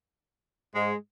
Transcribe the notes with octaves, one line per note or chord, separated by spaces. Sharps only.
G#2 G#3